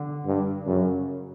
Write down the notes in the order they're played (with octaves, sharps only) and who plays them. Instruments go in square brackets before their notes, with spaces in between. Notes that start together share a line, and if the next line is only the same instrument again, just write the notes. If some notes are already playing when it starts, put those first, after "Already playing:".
Already playing: [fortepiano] D3
[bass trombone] G2
[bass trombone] F#2 [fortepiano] C#3